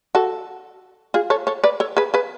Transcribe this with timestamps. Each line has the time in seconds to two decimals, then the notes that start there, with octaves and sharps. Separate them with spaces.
0.15 F#4 A4
1.14 F4 G#4
1.30 A4 C#5
1.47 A4 C#5
1.64 B4 D5
1.80 A4 C#5
1.97 G#4 B4
2.14 G#4 B4